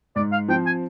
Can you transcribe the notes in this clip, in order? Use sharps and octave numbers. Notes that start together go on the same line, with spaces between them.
G#2 D5
F5
F3 C4 G5
G#5